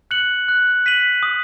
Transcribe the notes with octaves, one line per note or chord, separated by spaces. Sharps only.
F#6 C#7 F#7
F#6
B6 D#7 F#7
D#6